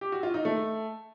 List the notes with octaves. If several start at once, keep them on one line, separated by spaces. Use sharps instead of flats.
G4
F#4
F4
D#4
A3